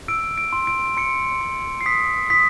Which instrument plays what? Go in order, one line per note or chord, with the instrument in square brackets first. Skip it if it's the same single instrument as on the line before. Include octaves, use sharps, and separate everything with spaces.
[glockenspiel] E6 D7
D7
C6
D7
C6 C#7
C6
C7
D#6 B6
D#6 B6